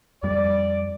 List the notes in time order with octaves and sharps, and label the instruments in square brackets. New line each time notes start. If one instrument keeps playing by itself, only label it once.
[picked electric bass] F2 G3 [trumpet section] D5